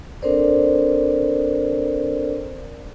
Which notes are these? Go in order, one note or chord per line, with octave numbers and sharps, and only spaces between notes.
C4 D4 A4 A#4 C5 D5